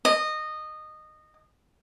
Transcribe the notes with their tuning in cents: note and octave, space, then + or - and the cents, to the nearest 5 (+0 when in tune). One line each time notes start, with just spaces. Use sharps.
D#5 -15